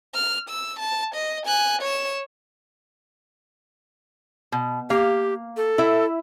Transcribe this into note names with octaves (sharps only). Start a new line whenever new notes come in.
F6
E6
A5
D#5
G#5 F#6
C#5 E7
B2
A#3 G4 F5
A4
E4 E5